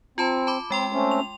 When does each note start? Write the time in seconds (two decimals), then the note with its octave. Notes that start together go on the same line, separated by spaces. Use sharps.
0.18 C4 F4 A5 B5
0.47 A5 B5 D6
0.70 G#3 C4 G5 C6
0.93 A3 C4 C#4
1.11 F7